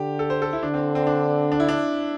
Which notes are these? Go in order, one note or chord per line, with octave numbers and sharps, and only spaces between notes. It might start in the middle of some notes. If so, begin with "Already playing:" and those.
Already playing: D3 G4
A4
C5
A4
E4
D3 D4
C4
C4
D4
D4
E4
D4